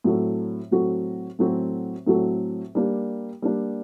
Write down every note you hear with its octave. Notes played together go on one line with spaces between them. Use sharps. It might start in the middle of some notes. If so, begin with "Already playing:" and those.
A2 F#3 C4 F#4 A4
A2 F#3 C4 F#4 A4
A2 F#3 C4 F#4 A4
A2 F#3 C4 F#4 A4
G3 A#3 D4
G3 A#3 D4